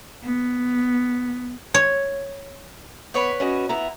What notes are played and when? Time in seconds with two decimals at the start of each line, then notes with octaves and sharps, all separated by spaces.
0.23 B3
1.74 C#5
3.14 B3 B4 C#5 D5
3.40 C#4 F#4 D#5
3.69 B3 E4 A#5